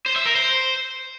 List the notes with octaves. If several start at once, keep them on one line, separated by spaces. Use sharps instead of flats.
C5
E5
A#4
C5